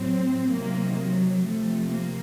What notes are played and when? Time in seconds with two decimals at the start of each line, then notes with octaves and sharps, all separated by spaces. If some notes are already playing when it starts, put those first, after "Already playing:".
Already playing: A2 F#3 C4
0.53 C3 D#3 F#3 A#3
0.99 F#3
1.44 C3 F3 A3
1.90 A#3